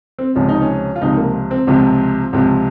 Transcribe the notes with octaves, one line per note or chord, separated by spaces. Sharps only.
C4
C#2 C3 F3 C#4
D#4
C#4
F4
C#2 C3 F3 D#4
A#3
C4
C#2 C3 F3
C#2 C3 F3